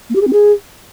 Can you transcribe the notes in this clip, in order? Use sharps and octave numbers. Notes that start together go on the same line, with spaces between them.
A#3
G4
G#4
C4
G#4